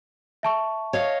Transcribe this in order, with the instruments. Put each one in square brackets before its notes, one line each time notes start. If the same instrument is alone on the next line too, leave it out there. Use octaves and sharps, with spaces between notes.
[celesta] E5 A5 C#6
[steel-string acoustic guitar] C#5 D#5 F5